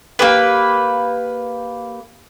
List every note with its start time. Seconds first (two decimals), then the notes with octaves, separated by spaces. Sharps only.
0.19 A#3 G4 B4